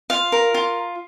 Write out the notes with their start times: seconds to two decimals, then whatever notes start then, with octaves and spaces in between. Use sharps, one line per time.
0.10 F4 F5
0.32 A#4
0.54 F4